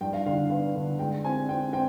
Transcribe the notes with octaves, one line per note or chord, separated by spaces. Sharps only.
G2 G5
F5
D3 F5
B3 F5
D3
G#3 G5
C4 G#5
C4 G5
C4 G5